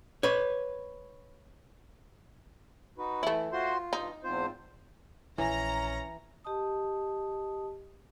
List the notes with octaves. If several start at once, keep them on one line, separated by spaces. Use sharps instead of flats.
B4 C#5
D#4 F#4 B4
E3 A3 E4
F4 F#4 C5 C6
G2 D#4
E2 G#2 C4 F4 C5
A#1 E3 C#4 A#5
G4 D#5 A5 D#6